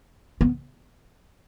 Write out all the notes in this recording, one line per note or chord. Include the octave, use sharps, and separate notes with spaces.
B3